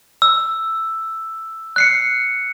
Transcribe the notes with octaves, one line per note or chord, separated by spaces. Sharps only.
E6
F#6 C7 C#7